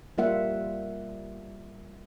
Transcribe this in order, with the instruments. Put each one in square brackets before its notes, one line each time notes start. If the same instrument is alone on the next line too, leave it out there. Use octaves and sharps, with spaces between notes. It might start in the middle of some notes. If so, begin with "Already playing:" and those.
[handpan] G3 A#3 F4 E5 F#5